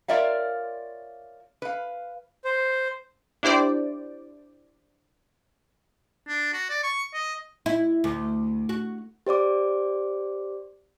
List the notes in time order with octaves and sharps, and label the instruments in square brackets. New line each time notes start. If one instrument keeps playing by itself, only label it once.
[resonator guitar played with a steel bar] F4 A#4 C#5 D5 E5 F5
B4 F5
[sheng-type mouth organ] C5
[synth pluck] D4 E4 G4 C5 D5
[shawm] D4
F#4
D5
C#6
D#5
[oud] E4
D2
F#4
[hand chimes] G4 C5 D5 D6